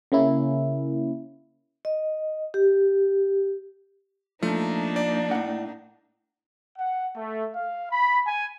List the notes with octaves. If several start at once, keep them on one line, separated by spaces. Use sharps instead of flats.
C#3 A#3 C#4 E4
D#5
G4
F3 A3 A#3 D4 D#4
D5
A2 F#5
F#5
A3
F5
B5
G#5